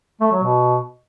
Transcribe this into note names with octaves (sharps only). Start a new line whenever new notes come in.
A3
F#3
B2